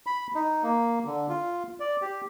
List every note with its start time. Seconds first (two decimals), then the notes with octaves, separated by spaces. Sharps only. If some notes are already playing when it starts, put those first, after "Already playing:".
0.06 B5
0.35 D#4
0.63 A#3
1.06 D3
1.29 F4
1.80 D5
2.01 G4